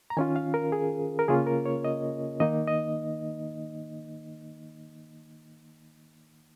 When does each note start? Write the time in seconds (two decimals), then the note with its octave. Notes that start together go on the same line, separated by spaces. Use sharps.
0.10 A#5
0.17 D#3 C#4 F4 G#5
0.36 F5
0.54 A#4
0.72 G#4
1.19 A#4
1.28 C#3 A#3 C#4 F4 G#4
1.47 A#4
1.66 C#5
1.84 D#5
2.40 D#3 A#3 D#4 D#5
2.68 D#5